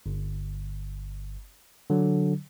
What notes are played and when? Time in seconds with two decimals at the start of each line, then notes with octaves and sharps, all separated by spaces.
0.06 G1
1.90 D3 F#3